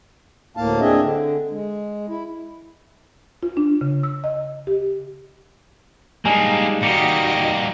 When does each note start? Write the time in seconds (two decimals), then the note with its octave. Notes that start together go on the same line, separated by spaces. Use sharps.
0.57 D2 A2 A#3 F5 A5
0.81 C4 D4 G#4 D#5 E5
1.01 D3
1.50 G#3
2.09 E4
3.43 F4
3.57 D4
3.81 C#3
4.03 E6
4.24 D#5
4.67 G4
6.25 G3 G#3 A#3 D4 D#4 G#5
6.83 G3 A#3 D#4 F#4 G4 D#5 C#7